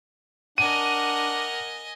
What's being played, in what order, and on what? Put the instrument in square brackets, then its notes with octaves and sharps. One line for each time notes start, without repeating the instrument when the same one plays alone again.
[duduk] D4 [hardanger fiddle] A#4 F#5 [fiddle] D#5 G#5 [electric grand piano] D#7